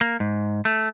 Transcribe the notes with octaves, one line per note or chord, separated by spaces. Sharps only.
A#3
G#2
A3